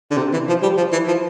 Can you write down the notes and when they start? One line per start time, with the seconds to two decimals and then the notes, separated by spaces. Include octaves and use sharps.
0.11 D3
0.17 C3
0.33 E3
0.48 F3
0.62 G3
0.77 F3
0.92 E3
1.07 F3